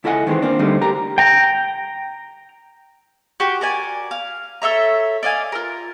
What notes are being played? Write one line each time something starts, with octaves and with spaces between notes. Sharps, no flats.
C#2 E4 A4 D#5 F#5 G#5
D#3 E3 G#3 A3 C4
A#3 C4 D4
D3 G3 A3 A#3 C4 D#4
G4 A#4 A#5
G5 A#5
F#4 G4 G5
A#4 D5 G#5
F5
A4 C#5 E5 A#5
D5 D#5 F5 G#5
F4 A#4